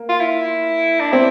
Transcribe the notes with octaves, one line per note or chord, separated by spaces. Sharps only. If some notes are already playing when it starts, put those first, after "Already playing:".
Already playing: A#3
F4
E4
D4
C4 E4